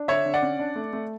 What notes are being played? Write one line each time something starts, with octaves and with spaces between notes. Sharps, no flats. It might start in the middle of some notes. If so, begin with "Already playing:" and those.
Already playing: D4
D3 C#5 E5
D3
D5 F#5
C#4
D4
A3
A3